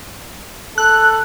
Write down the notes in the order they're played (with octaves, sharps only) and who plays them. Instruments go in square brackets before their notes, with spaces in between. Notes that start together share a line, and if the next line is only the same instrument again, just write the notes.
[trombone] A4 [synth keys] F#6